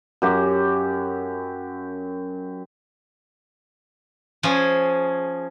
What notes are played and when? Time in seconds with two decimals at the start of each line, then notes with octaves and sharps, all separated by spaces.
0.22 F#2 G4 F#5
4.43 F3 C#4 G#4